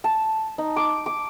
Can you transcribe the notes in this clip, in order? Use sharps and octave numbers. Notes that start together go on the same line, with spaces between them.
A5
D#4
D6
D6